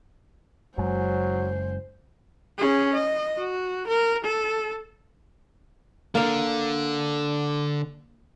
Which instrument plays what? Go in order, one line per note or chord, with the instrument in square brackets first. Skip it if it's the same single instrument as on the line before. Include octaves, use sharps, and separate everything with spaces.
[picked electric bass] F#1 F#2 G#3 [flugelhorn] F#3 [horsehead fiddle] C5
[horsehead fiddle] C#4 G#4
D#5
F#4
A#4
A4
[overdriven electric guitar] D3 [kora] A#3 F5